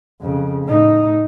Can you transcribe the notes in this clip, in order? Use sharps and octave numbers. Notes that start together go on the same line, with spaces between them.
F2 C#3
A2 D#4